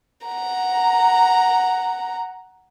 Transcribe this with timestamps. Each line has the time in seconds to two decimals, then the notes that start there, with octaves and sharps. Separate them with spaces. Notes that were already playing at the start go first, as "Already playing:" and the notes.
0.26 F#5 A#5